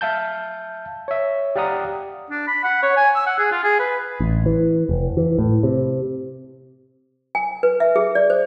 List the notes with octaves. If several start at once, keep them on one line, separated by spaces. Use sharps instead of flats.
E5 F5 A5 G6
C#5 E5
G4 D5 F5 F#5 A#5 D#6
D4
B5
F#5
C#5
G#5
E6
F#5
G#4
F4
G#4
B4
A1
E3
F1
E3
A2
C3
G#5
B4
E5
G#4
D5
C5